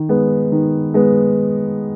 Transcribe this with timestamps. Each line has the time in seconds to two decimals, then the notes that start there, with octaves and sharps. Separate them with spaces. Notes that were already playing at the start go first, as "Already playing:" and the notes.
Already playing: D#3
0.09 G#3 B3
0.52 D#3
0.94 G#3 B3